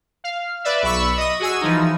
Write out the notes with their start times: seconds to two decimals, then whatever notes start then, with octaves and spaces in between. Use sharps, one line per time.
0.24 F5
0.64 B4 D5 E5
0.83 B1 B5 C#6 E6
1.17 D#5 D#6
1.40 F#4 G#4 G#5 E6
1.61 E3 F3 D#4